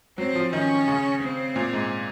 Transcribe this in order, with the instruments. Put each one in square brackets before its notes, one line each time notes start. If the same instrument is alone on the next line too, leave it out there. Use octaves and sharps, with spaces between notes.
[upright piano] F#3 [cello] C4
[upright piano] F3
[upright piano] D#3 [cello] C#4
[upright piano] C#3
[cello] C4
[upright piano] A#2
G#2